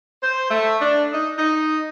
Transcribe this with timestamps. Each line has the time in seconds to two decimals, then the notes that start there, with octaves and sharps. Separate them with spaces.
0.22 C5
0.49 A3
0.79 D4
1.12 D#4
1.38 D#4